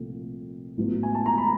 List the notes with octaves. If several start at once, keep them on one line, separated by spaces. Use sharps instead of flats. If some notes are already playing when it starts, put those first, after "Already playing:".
Already playing: C2 A#2 F3 A3 C4
A1 A2 F#3 B3
G#5
A5
A#5
B5